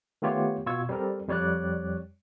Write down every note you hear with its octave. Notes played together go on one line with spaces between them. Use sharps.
D#3 A3 B3 F4 G4 C#5
B2 F4 C#6 E6 G#6
G3 C4 A4 A#4
F2 G3 C#5 D5 F#6